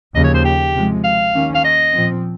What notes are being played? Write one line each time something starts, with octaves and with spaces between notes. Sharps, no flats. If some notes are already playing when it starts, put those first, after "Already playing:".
D#2 C#3 F3 D#5
C#5
C5
G4
C3 F3 G#3
F5
D#2 D#3 A#3 C#4
F5
D#5
A#2 F3 C4